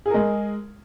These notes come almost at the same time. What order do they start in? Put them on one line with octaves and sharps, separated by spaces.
G#4 A#4 G#3